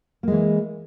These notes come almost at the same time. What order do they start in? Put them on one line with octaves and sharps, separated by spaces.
A#3 G#3 E3